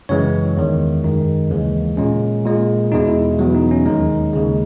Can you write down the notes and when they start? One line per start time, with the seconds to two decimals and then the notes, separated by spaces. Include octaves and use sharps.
0.09 F#2 C#3 E3 G#3 C#5
0.57 E2 D#3 G#3
1.04 F#2 D#3 G#3 D#4
1.51 D#2 C#3 E3 G#3
1.97 A#2 G#3 C#4
2.45 A#2 G#3
2.92 E2 B2 G#3 D#4
3.08 E4
3.39 E2 B2 F#3
3.55 D#4
3.71 C#4
3.86 D#2 D#3 G#3 D#4
4.33 D#2 C#3 G#3